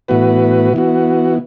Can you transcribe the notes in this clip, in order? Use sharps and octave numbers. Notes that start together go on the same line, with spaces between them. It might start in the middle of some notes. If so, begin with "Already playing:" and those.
A2 E3 B3 F#4 B4
E3 B3 F#4